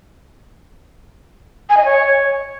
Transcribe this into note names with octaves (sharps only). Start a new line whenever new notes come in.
G#5
D#5
C#5